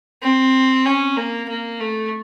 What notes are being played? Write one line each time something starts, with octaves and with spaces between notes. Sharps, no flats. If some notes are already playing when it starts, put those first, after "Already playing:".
C4
C#4
A#3
A#3
A3